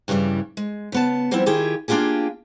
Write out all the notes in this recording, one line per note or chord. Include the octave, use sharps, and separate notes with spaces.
G2 C#3 E3 G3 D4
G#3
C#3 B3 A5
F3 G3 B3 C4 E4
D#3 E4 F4 G4 G#4
A#3 D4 D#4 F4 G4 G#4